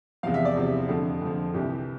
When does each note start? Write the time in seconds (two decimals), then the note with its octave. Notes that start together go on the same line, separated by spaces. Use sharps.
0.23 E2 C3 F3 F5
0.34 E5
0.45 D5
0.56 E2 C3 F3 F4
0.72 E4
0.89 F2 D3 F3 F4
1.21 F2 D3 F3
1.54 C2 C3 E3 G4